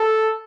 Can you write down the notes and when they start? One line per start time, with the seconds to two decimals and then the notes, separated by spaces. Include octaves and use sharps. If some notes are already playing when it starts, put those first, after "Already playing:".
Already playing: A4